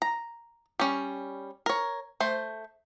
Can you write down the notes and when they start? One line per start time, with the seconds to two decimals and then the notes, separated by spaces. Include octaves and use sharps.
0.02 A#5
0.79 G3 C#4
1.66 A#4 C#5
2.20 A3 C5